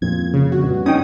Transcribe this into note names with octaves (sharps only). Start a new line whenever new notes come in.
F2 A#2 G#6
C#3
F#4
G2
C#4 D#4 G5 D#6